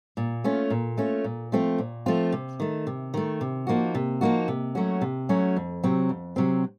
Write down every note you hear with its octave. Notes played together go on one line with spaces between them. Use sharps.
A#2
A3 C#4 F4
A#2
A3 C#4 F4
A#2
F3 A3 C4 F4
A#2
F3 A3 C4 F4
C3
D#3 A3
C3
D#3 A3
C3
F3 A#3 D#4 F#4
C3
F3 A#3 D#4 F#4
C3
F#3 A3 C#4 F#4
C3
F#3 A3 C#4 F#4
F2
C3 F#3 C4
F2
C3 F#3 C4